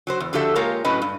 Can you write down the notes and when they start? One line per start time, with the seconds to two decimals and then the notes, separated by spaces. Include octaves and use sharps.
0.07 F#3 F#4 C5
0.20 E2
0.33 D3 F3 F#4 G4 A4 E5
0.55 G#3 A#3 F4 G4 A#4 C#5
0.84 A2 F#3 C#4 B4 D#5
1.02 G2